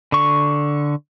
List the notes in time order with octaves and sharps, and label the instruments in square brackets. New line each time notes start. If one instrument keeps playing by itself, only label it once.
[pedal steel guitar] D3 C#6